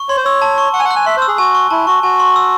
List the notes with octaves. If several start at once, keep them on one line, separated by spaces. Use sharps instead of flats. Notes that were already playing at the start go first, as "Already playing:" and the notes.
Already playing: C#6
C#5 C6
C5
C#5 E6
A5
C#6
F#5 C#6
G#5
F#5
F#6
G#5
E5 C6
C5
E6
G#4
F#4 G#5
C#6
E4 A5
F#4 C#6
F#4 G#5
C6
E6